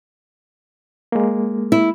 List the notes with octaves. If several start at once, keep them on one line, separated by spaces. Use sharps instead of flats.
G#3 A#3
E4